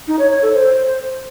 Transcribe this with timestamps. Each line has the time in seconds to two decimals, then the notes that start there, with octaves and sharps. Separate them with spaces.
0.08 D#4
0.19 C#5
0.31 C#5
0.42 A4
0.54 C5